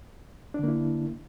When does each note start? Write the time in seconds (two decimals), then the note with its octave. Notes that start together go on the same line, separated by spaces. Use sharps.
0.54 D4
0.59 D3
0.63 A#3
0.68 E4